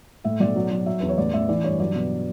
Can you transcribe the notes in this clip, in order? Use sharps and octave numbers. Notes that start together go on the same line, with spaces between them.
A2 E5
B1 D5
F#3
F#3
F#3 E5
E2 B4
C#5
A1 D5
A1 E5
E3 D5
G2 C#5
F#3 D5
B2